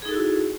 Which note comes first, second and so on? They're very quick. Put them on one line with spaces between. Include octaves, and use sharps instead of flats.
G#4 D#4 A4 F#4 E4